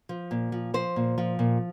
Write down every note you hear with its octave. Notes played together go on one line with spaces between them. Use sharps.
F3
A#2
F3
F3 C5
A#2
F3
A#2